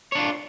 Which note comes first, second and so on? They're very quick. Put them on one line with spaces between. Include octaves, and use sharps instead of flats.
C#5 D4 F4